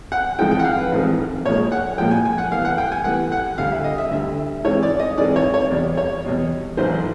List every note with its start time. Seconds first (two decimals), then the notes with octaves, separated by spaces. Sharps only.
0.12 F#5
0.39 A1 G#2 F3 G#3 C4 G5
0.51 G5
0.59 F#5
0.64 F5
0.78 B4
0.92 A1 G#2 F3 G#3 C4
1.45 A#1 A#2 F3 G#3 C#5
1.72 F#5
1.98 A#1 A#2 F3 G#3 G5
2.11 G#5
2.25 G#5
2.38 F#5
2.51 A2 E3 G3 B3 F5
2.65 F#5
2.78 G5
2.92 G#5
3.04 A2 E3 G3 B3 F#5
3.32 F#5
3.58 D2 D3 G3 F5
3.72 E5
3.84 D#5
3.98 E5
4.11 D2 D3 G3 E5
4.64 G#2 E3 G#3 C4 C#5
4.83 D5
5.00 D#5
5.18 G#2 E3 G#3 C4 D5
5.36 C#5
5.54 C#5
5.71 E2 B2 G3 D5
5.97 C#5
6.24 E2 B2 G3
6.77 A1 G#2 D#3 F#3 C5